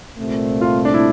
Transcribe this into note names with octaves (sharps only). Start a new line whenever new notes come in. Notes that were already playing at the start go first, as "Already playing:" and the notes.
C2 A#2 A3 C4
F4
D4
E4